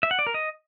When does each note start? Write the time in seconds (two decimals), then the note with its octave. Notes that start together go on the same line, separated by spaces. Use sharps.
0.03 E5
0.11 F#5
0.19 D5
0.27 A#4
0.34 D#5